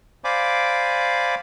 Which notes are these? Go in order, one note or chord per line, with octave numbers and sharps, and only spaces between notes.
C5 D5 F5 G#5 B5 D6